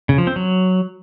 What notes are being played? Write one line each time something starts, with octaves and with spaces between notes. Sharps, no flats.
C#3
F3
C4
F#3